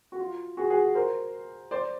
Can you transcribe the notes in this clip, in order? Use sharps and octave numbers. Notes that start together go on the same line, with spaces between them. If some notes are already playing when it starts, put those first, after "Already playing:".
F#4
F4
F#4 G#4
F#4 G#4
A#4 C5
C5 D5